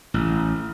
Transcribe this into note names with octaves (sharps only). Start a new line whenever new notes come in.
A1